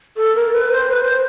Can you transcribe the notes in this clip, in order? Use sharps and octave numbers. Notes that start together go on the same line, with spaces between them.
A4
A#4
B4
C5
B4
C5